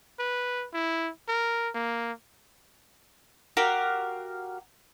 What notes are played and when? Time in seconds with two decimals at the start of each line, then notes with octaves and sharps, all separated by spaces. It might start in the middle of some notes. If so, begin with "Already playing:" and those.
0.19 B4
0.74 E4
1.28 A#4
1.75 A#3
3.57 F#4 G4 A#4 F5